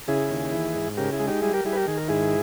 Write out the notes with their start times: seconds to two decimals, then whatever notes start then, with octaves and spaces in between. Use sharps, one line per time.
0.08 C#3 E4 G#4
0.30 D#2
0.52 E3
0.75 G#2
0.97 C#3 G4 A#4
1.12 E4 G#4
1.20 G#3
1.27 D#4 G4
1.42 G3 E4 G#4
1.54 G4 A#4
1.65 G3 E4 G#4
1.73 B4
1.77 G4 A#4
1.87 D#3 G#4
1.97 A#4
2.08 G#2 E4 G#4